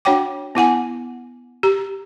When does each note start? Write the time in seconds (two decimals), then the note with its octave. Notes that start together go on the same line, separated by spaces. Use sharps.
0.05 D4 F#4 C#5 F#5 G5 D6
0.55 B3 E4 F#5 G#5
1.63 G4 A#5